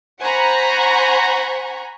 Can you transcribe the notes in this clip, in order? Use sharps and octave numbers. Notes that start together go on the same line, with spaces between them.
C5 F#5 G#5 A#5 B5 C#6